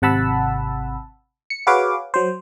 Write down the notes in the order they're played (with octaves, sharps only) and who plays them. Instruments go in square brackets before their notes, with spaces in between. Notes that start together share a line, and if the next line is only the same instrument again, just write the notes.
[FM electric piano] G#1 C3 F#5 A5 B5 E6
C#7
F#4 G#4 B4 C#5 F5 D6
F#3 C5